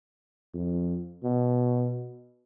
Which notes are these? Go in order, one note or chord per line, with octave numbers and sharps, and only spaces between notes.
F2
B2